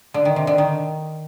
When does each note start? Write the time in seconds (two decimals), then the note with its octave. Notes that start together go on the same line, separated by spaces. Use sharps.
0.14 D3
0.25 D#3
0.36 C3
0.47 D3
0.58 D#3